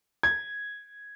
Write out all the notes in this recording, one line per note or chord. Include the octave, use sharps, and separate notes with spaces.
G#6